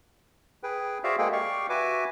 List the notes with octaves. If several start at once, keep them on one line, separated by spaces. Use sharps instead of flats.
G#4 B4 G5
F#4 G#4 C5 D5 E5 F5
G#3 A#3 G#4 A4 G5
G4 D5 F5 G5 C#6
F#4 B4 E5 G#5 D6